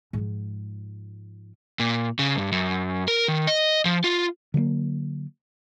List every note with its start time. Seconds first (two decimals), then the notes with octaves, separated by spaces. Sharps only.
0.13 G#2 F3
1.79 A#2
2.19 C#3
2.36 G2
2.52 F#2
3.08 A#4
3.28 D#3
3.47 D#5
3.85 F3
4.04 F4
4.54 D3 F#3 G3 A#3